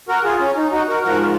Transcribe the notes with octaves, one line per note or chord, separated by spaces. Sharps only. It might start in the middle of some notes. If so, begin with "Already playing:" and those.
F#4 A#4
F4 G#4
C#4
D#4
D#4 F#4
F#4 A#4
G#2 F3 F#4 A#4